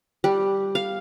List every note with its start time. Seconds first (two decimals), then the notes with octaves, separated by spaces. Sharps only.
0.24 G3
0.75 F5